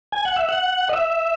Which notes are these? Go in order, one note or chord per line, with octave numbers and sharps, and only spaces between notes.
G#5
F#5
E5
F#5
D#5
E5